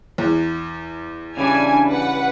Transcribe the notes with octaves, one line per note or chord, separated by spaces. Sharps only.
E2
C#3 E3 G3 D4 G#5
B4 F#5